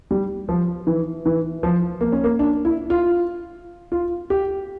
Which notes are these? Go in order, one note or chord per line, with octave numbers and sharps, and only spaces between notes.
G3
F3
E3
E3
F3
A#3
C#4
A#3
D4
E4
F4
F4
G4